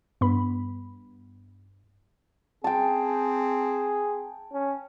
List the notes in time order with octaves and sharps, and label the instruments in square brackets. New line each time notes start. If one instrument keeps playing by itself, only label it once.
[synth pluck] G2 B3 B5
[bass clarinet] C4 [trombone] G#4 [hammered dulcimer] G5 A5
[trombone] C#4